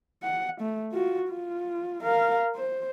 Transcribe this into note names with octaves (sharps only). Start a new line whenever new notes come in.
F#5
A3
F4 F#4
F4
A#4 F5
C5